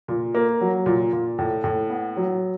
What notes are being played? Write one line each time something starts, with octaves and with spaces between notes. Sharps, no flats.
A#2
A#3
F#3
A#2
A#2
A2
A2
B3
F#3